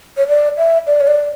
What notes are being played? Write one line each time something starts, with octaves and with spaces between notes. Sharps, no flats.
C#5
D5
E5
D5
C#5
D5